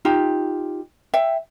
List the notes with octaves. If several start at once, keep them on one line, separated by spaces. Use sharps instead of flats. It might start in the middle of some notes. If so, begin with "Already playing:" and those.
D#4 F4 G4
E5 G5